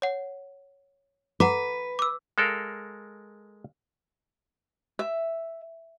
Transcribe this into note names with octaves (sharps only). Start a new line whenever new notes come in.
C#5 F#5
B4 F#5 A#5 D6
D6 E6
G#3 A4 A#4 F5
E5